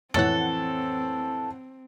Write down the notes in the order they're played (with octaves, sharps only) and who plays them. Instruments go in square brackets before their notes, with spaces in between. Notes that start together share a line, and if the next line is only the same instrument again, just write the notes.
[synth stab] F2 A2 F#5 [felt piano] E3 C#5 A6 [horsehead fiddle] C4 [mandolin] A4